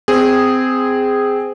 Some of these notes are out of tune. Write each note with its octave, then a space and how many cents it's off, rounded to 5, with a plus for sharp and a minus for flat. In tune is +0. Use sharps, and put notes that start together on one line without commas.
C4 -20 G#4 -10